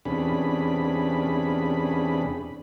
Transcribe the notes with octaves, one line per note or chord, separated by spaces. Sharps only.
E2 C3 C#4 D4 G#4 B5